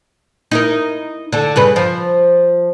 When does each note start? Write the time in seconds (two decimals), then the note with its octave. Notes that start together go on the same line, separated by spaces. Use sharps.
0.51 D#4 E4 A#4
1.32 D3 A4
1.56 G2 C#3 B4
1.76 F3